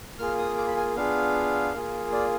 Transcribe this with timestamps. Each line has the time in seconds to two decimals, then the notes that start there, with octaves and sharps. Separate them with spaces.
0.19 A#3 F4 G#4 F6
0.38 D#6
0.58 D6
0.67 B5
0.77 G#5
0.96 B3 D4 F4 G#4 F5
1.73 A#3 F4 G#4
2.12 D5